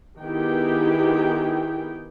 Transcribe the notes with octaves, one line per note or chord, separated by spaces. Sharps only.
D#3 B3 E4 G4 G#4 G5